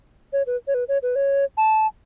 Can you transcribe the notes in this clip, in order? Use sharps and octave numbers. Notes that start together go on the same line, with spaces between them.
C#5
B4
C#5
B4
C#5
B4
C#5
A5